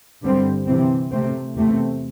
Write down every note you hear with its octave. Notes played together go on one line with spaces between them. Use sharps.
G2 D3 G3 C4
C3 E3 C4
C3 A3 C4
E2 C3 A3 C4